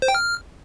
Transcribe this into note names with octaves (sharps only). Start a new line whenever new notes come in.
C5
G5
F6